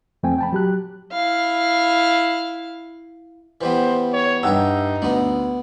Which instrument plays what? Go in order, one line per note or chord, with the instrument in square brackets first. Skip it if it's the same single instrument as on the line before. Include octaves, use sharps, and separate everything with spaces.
[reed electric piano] F2 A3 C4 G5 G#5
G5 A5 B5
F#3 G4 F#6
[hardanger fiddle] E4 F5
[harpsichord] E3 G3 B3 [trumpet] C5
[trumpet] C#5
[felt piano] G2 F#5 E6 [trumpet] D#4 [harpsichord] G4 E5
[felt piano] D2 [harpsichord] B3 D4